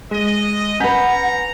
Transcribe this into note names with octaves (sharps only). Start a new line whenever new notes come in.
G#3 D#5
C#4 B4 F#5 G#5 A#5 G6 B6